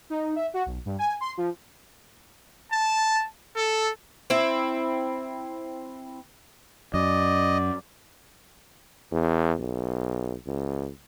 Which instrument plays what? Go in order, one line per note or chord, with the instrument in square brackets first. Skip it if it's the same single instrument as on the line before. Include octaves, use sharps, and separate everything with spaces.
[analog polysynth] D#4
E5
F#4
B1
G2
G#5
C6
F3
[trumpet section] A5
A4
[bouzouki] C4 E4
[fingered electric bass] F#2 [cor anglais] D5 [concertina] D#5
[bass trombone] E2
B1
C#2